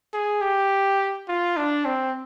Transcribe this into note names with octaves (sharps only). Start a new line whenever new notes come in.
G#4
G4
F4
D4
C4